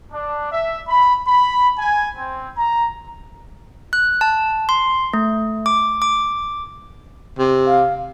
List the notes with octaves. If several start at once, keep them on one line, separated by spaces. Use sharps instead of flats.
D4
E5
B5
B5
G#5
C4
A#5
F#6
A5
C6
A3
D6
D6
C3
F5